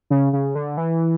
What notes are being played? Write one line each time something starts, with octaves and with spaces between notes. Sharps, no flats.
C#3
C#3
D3
E3